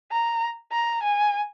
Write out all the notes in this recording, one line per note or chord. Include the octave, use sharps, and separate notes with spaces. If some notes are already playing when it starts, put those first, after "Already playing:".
A#5
A#5
G#5